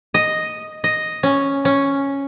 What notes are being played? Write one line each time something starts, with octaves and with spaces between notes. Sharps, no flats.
D#5
D#5
C#4
C#4